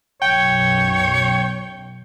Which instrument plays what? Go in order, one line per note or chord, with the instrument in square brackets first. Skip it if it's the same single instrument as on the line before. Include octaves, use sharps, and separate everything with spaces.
[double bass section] B1 F#2 B2 [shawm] C#5 [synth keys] G5